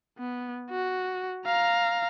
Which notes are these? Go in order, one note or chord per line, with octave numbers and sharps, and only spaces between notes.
B3
F#4
F5 A#5